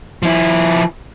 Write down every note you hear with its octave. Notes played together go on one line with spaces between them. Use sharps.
F3 E4